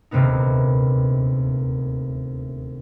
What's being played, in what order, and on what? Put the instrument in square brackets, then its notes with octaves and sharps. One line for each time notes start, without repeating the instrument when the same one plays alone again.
[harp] D#1 D2 C3 A#3 B3 D#4